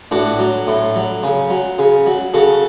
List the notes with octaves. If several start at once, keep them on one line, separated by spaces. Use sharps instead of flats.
A2 D4 F#4
F#3
A2
F#3
C#3
F#3
C#3
F#3
C#3 F#4 A4